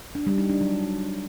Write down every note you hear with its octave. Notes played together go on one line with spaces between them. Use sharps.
D4
G3
D#4
D4
F#3